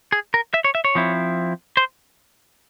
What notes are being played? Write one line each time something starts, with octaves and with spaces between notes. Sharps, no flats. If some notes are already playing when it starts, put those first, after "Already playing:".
G#4
A#4
E5
C#5
E5
C#5
F3 C4 E4
C5